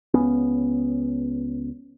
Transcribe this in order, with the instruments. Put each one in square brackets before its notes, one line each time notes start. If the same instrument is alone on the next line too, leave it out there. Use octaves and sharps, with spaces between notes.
[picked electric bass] C#2 B3 C#4